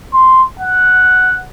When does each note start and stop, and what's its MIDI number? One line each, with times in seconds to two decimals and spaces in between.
0.14 0.43 84
0.59 1.41 78